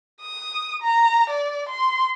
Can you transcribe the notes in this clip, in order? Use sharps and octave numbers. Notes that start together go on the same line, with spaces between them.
D#6
A#5
D5
C6